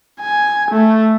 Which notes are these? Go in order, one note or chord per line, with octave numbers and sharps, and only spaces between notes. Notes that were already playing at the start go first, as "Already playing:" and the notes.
G#5
A3